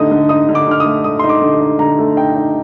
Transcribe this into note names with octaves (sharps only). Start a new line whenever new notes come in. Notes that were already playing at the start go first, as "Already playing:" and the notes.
Already playing: D3 A3 D#4 D#6
D3
D#4 D#6
D3
D6
D3 F6
D#6
A3
A3 D#6
D#4 C6
D6
D3
D#4
D3 A#5
A3
D#4 G5
D#4